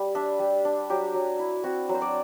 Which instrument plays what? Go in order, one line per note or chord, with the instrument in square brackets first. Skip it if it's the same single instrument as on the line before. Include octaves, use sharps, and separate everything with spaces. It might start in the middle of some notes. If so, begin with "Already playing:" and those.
Already playing: [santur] G3
D4 E5
G3
D4
F#3 G4
F#3
E4
C4 F#4
F#3
C5
D5